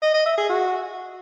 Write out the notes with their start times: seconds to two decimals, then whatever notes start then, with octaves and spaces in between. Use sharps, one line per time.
0.02 D#5
0.14 D#5
0.26 E5
0.38 G#4
0.49 F#4